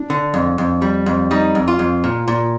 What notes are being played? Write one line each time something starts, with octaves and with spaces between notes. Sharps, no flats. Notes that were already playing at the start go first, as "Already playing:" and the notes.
Already playing: D4
D3
F2
F2
G3
F2
G3 D#4
F2
F4
F2
A#2
A#2